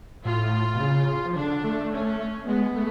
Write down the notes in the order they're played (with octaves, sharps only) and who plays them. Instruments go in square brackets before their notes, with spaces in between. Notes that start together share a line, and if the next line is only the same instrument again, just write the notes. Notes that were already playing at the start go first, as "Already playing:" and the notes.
[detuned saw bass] A2 [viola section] F4
[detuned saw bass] B2
C#3
F3
[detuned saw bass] D3 [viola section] D4
[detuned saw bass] A3
[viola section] C#4
[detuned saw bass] G#3 [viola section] B3
[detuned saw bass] A3